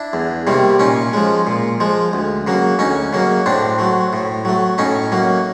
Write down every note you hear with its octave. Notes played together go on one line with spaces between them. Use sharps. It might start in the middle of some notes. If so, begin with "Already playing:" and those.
Already playing: D4 E4
E2
C3 D#3 G3 A#3
A#2 C#4 D#4
F3 G#3
A#2
F3 G#3
D2
C#3 F#3 A#3
D2 C#4 D#4
C#3 F#3 A#3
A2 C4 D4
F#3 A3
A2
F#3 A3
A2 C#4 D#4
F#3 A#3